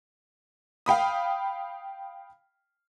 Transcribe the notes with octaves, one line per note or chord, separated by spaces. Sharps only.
F5 G5 B5 D#6